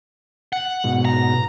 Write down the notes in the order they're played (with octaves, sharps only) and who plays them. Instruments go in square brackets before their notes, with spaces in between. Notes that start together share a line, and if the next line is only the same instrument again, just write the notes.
[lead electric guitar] F#5
[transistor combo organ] G#2 B2
[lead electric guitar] A#5